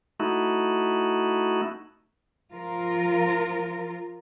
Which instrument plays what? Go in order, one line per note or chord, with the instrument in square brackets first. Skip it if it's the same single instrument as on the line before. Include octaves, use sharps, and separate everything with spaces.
[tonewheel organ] A3 D#4 E4 F#4
[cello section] F3 F4 A#4